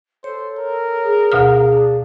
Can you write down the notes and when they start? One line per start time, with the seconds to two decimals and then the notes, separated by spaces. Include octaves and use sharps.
0.24 A4 C5 C#5
0.59 A#4
1.02 G#4
1.32 D2 B2 G#4 F5 F6
1.72 D4